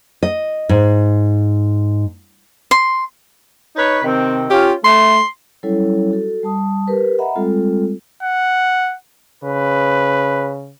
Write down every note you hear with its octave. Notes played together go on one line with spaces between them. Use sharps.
D#5
G#2
C6
D#4 B4 C#5
C3 D#3 C4
C#4 F4 G4
A3 C6
F#3 G3 C#4 E4 A4 C#5
F#4 A4
G3 A5 D#6
G4 A#4 B4
D#5 E5 F#5 A#5 B5
G3 G#3 C4 F4 A4
F#5
C#3 B4